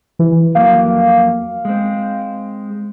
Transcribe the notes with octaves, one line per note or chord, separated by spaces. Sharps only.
E3
F2 F#3 A#3 F5
G#3 C4